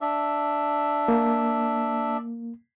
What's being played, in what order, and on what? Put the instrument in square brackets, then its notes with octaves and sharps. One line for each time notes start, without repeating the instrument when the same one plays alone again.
[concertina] D4 E5
[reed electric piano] A#3